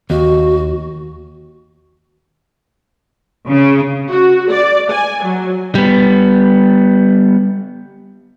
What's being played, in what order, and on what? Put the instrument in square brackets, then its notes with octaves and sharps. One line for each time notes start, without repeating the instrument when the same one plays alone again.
[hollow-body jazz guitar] D#2 [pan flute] F#4
[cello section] C#3
[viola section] F#4
D5
G#5
F#3
[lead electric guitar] G3 B3